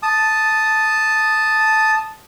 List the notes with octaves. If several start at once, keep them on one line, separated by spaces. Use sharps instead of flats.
A5 D#6